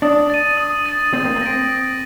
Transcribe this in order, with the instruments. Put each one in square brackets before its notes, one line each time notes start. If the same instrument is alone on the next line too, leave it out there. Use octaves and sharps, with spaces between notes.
[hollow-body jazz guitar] D4 [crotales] D#6
[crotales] A6 D#7
D#6
A6 D#7
[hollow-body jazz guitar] C4 [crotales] D#6
[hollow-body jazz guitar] A#3
C4
[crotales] A#6 D7
D#6